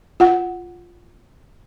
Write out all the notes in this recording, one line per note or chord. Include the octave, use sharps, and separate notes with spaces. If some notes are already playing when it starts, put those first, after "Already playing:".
F4 F#5